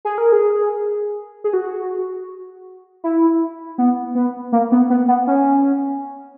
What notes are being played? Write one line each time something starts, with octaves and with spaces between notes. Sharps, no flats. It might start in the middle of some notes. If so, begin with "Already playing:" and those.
G#4
A#4
G#4
G#4
F#4
E4
B3
B3
A#3
B3
B3
B3
C#4